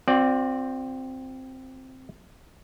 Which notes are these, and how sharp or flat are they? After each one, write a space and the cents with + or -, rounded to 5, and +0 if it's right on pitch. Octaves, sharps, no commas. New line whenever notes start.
C4 +0 F4 +45 D5 +0